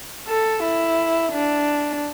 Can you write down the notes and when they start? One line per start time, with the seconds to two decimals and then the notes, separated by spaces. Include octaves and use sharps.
0.28 A4
0.63 E4
1.33 D4